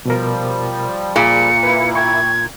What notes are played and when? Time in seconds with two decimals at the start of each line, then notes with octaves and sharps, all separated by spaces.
0.06 B2 F3 G3 A#4
1.16 A#2 G#4 B5 C#7
1.63 A#3 E4 B4
1.95 G5 C#6 G#6